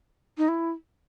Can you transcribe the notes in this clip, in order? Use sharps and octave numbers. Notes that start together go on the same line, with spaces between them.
D#4
E4